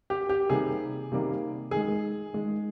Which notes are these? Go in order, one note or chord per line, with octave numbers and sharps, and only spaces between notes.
G4
G4
C3 D#3 G3 A#3 G#4
C3 D#3 G3 A#3
D#3 G#4
G#3
D#3 G#3